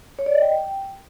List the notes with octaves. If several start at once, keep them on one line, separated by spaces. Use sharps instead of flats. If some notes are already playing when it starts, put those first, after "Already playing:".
C#5
D5
D#5
G5